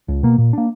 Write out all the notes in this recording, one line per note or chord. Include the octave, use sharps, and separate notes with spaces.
C#2
B2 A#3
A#2
A#3 D4